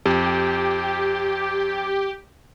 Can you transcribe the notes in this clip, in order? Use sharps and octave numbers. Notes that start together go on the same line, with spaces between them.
F2 G4